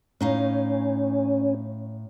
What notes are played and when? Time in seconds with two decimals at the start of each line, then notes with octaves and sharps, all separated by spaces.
0.21 A2 C#4 D#4 F5